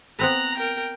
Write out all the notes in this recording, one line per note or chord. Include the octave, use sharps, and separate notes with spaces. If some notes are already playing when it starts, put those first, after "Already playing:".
B3 C4 B4 A#5 F#6
A#4 G5